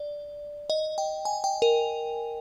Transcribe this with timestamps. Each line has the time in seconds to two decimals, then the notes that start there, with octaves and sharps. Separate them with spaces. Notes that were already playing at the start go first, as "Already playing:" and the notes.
Already playing: D5
0.70 D#5
0.98 G5
1.25 G#5
1.44 G5
1.62 A#4